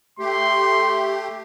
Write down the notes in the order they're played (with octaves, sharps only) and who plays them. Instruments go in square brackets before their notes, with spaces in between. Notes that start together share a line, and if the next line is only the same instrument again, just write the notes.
[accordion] A3 G4 [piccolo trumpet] C6